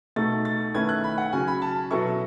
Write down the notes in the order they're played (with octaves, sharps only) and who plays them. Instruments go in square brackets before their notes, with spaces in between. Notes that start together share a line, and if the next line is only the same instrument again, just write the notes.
[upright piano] B2 A3 D#4 [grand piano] A6
[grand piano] A6
[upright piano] D#3 A3 C#4 E4 B4 [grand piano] G#6
[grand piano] F#6
B5
F#5
[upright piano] C#3 F#3 C#4 [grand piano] G#5
[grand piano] B5
A5
[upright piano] B2 F#3 B3 E4 A4 [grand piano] C#6